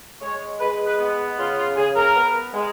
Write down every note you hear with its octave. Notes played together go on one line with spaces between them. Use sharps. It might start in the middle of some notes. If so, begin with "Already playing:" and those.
G#3 C#5
G#3 B4
B4
B3
C#3 F4
F4
C#3 G#4
A#4
B3
G#3